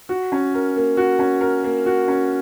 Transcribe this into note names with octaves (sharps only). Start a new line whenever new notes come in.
F#4
C#4
A#4
A#3
F#4
C#4
A#4
A#3
F#4
C#4